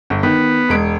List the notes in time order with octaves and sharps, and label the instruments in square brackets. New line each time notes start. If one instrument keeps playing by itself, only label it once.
[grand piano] G1
[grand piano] D#3 [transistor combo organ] B3
[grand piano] E1 G#3 D7